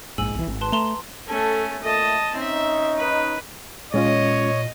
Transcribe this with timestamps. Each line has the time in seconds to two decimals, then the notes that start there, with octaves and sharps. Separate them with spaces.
0.18 A#1 G#2 G#5 E6 F#7
0.35 B1 E3
0.47 G#1
0.61 B4 A5 C6
0.72 A3 A#5 C6 E7
1.28 A3 C#4 A4
1.83 A#2 A3 D#5 A5
2.35 C4 C#4 D#4 E5
2.97 B4
3.94 A#2 G#3 C#4 F4 C#5 D#5